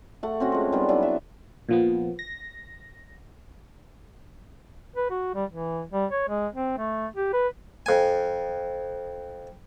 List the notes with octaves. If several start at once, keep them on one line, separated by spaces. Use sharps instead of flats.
A3 F#5
C4 C#4 F#4
F3 G#3
D#3 G3 B3
E3 F#3 D4 E4
E5
A#2 F3 B3
A#6
B4
F#4
G3
E3
G3
C#5
G#3
C4
A3
G4
B4
F2 G#5